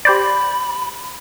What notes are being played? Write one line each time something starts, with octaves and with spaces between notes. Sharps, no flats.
G4 C5 D5 B5